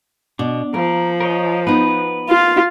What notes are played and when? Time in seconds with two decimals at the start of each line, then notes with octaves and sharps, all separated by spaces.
0.39 B2 D4
0.74 F3 A#3 A#4
1.20 A#4 C#5 D#5
1.67 B3 D#4 B4
2.29 F4 F5